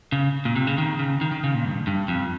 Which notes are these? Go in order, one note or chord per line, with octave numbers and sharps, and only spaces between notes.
C#3
A#2
C3
C#3
D#3
C#3
D#3
D#3
C#3
A#2
G2
G2
F2